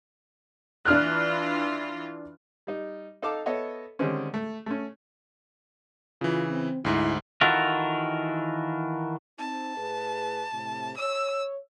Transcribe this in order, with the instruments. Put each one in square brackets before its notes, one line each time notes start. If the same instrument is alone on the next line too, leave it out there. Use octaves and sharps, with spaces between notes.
[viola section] E3 F4 [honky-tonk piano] D4 F6 F#6
[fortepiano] G3 D#4
D#4 A4 F5 A5 D6
B3 A4 C#5 D#5 E5
D3 D#3 G3 G#3 C4 C#4
A3
A3 C#4
[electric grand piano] C#3 E3 [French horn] F4
[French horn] C4
[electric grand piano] D2 G#2 [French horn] E4
[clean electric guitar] D#3 E3 F4 F#4 A4 A#4
[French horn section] C4 D#4 [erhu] A5
[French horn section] A2 G#4 B4
A2 C3
[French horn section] C#5 [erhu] E6